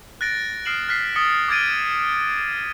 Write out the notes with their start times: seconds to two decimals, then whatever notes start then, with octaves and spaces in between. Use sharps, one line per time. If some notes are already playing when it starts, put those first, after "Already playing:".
0.21 F#6 A6 A#6 D7
0.65 D#6 F6 C7 D7 E7 F#7
0.89 F6 F#6 B6 C7
1.16 D#6 A6 B6 C#7 G7
1.48 D6 F6 G#6 A6 D7 D#7